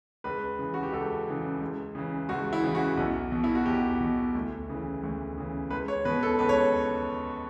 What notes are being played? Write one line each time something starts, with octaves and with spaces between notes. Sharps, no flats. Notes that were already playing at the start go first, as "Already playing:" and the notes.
C#2 B4
C#3 E3
F#4
G4
C#2 A4
C#3 E3
C#2
C#3 E3
C#2 F#4
E4
C#3 E3
F#4
B1
B2
E4
F#4
B1 G4
B2
D2
C#3 E3
D2
C#3 E3
C#2 B4
C#5
B2 B4
A4
C#2 B4
C#5